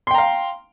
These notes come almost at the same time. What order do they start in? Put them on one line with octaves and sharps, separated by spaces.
C6 G5 A#5 F5